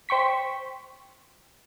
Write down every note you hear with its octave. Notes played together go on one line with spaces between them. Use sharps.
C5 G5 C#6 B6